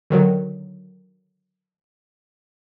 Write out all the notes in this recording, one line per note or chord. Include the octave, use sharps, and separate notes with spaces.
D3 D#3 F#3